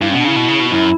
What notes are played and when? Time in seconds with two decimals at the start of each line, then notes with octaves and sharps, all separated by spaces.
0.01 G2 E4
0.09 C#4
0.13 B2
0.19 D4
0.24 C#3 E4
0.36 B2
0.48 C#3
0.60 B2
0.71 F#2 E4